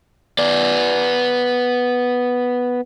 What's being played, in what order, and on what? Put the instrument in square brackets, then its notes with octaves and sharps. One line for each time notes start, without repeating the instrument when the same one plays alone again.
[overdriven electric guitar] B3 D5